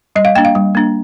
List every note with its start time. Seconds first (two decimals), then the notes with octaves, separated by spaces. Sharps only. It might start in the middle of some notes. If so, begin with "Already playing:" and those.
0.16 G3 D#5
0.25 F5
0.35 A#3 D4 G5
0.45 F5
0.55 G3
0.75 A#3 D4